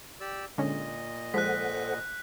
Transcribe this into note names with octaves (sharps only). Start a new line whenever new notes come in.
G4 D5 E6
A#2 D3 G#3 C#4 D#5
F3 G#3 A4 C5 F#5 F#6 B6